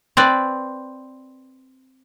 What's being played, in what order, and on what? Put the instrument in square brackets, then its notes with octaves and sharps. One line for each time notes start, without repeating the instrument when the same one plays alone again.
[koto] C4 B4 D5